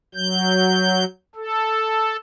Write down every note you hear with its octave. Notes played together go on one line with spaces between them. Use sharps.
F#3 G6
A4